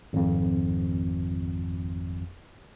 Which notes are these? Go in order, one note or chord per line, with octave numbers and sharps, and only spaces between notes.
G#1 F2